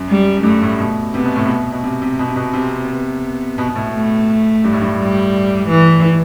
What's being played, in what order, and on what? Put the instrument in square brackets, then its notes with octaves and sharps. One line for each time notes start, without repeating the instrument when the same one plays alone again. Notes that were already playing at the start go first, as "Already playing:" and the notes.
Already playing: [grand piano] F#2
[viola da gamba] G3
[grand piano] F#2
[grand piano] G2 [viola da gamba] A3
[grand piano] A2
B2
[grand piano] C3 [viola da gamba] B3
[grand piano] B2
A2
B2
B2
C3
C3
B2
C3
B2
[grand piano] C3 [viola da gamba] C4
[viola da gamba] B3
[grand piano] B2
B2
A2
[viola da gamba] A3
[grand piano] G2
A2
G2
[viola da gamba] G3
E3